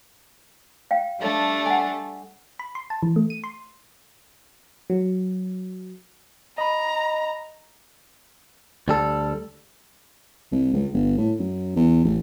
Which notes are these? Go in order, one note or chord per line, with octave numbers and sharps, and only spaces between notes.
F5 G5
G3 A3 D4
F#5 G#5
B5
C6
A5
E3
A3
D#7
C6
F#3
D#5 A#5 B5
D2 G3 A4
C2
C#2
G1
A2
F#2
E2
A1